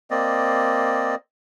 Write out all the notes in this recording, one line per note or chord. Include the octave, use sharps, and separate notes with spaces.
A#3 C4 D5 D#5